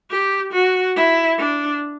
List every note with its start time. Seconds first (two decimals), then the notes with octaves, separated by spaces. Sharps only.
0.10 G4
0.53 F#4
0.96 E4
1.38 D4